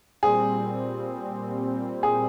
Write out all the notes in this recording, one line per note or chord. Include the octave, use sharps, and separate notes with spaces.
A#2 G3 C4 G#4
G#4